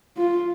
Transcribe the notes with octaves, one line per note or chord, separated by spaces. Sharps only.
F4